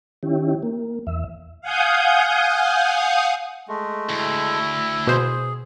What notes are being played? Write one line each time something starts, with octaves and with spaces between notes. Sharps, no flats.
D#3 C#4 E4 G4
A#3
E2 E5
F5 F#5 G#5 D#6 G6
G#3 A3
D2 E4
B2 G#4 C5